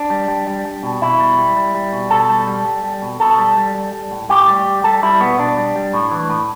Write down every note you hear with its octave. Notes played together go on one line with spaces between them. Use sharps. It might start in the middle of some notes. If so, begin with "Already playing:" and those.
Already playing: D4
G3
G3
G3
G3
B2
B2 E4
G3
G3
G3
G3
B2
B2 A4
G3
G3
G3
G3
B2
B2 A4
G3
G3
G3
G3
A2
A2 G4
G3
G3
G3 A4
G3 E4
B2 B3
B2 D4
G3
G3
A2
E3
A2